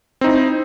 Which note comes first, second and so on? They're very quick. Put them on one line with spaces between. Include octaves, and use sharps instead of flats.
C4 D#4 E4